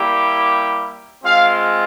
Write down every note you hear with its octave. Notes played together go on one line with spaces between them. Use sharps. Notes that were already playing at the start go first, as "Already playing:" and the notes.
Already playing: G3 A#3 E4 G4
G#3 C4 F4 F5